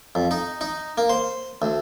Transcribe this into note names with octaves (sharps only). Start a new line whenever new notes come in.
F2
D#4
D#4
A#3
C5
D2